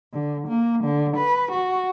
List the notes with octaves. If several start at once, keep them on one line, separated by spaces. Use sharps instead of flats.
D3
A#3
D3
B4
F#4